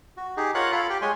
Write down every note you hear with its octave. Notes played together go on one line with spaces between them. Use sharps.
F#4
D#4 G4 G#4
F4 A#4 C#5 F5 F#5 F#6
F4 A4 F5 B5
G4 G5
G#3 C#5 G#5 C6